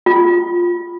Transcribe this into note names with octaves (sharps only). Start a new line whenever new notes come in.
F4